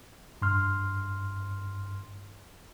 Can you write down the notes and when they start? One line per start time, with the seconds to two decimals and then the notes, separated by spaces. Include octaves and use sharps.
0.42 G2 C6 F6